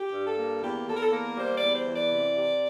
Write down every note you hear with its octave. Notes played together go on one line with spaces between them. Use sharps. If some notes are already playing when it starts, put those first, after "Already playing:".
Already playing: G4
G2
A4
A#3
E2 G4
E2 A4
A#4
A4
A#3 A#4
G3 C5
D5
E2
C5
E3
D5
C3
C3